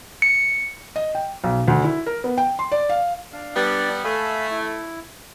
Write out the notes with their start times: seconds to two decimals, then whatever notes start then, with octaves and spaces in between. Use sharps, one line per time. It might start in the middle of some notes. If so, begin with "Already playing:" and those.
0.22 C#7
0.96 D#5
1.15 G5
1.44 B1
1.68 D2
1.84 E4
2.06 A#4
2.24 B3
2.38 G5
2.59 C6
2.72 D5
2.89 F5
3.33 D4 F5
3.56 G3 B3 D4 D5
4.05 A3 F5 G#5 B5
4.51 E4